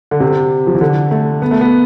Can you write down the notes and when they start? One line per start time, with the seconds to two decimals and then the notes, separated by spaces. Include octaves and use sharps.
0.11 D3
0.20 C3
0.67 F3
0.75 E3
0.81 D3
1.11 A3
1.42 B3
1.51 A3
1.61 B3